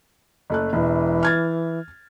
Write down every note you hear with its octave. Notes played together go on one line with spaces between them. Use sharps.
F#1 A3 F#6
E1 E3
F6 G#6 A6